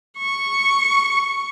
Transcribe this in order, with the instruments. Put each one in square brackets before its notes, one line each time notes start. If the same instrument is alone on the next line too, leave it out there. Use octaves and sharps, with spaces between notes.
[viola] C#6